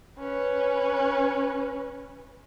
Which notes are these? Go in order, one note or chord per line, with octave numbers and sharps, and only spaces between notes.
C#4 B4